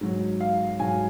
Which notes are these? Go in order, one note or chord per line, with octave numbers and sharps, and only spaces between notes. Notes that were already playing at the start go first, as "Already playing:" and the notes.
G#2 F#3
F5
G#2 F#3 G#5